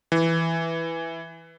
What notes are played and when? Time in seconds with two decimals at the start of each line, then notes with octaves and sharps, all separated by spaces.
0.12 E3